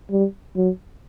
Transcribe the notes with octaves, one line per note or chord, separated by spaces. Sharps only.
G3
F#3